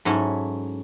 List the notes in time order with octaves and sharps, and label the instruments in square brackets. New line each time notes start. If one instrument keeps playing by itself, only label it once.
[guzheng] G#2 F#3 C#4 E4 A4